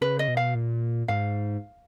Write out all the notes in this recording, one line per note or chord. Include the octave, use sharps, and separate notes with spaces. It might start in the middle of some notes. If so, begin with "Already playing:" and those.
C#3 B4
D#5
B2
F5
A#2
G#2 F5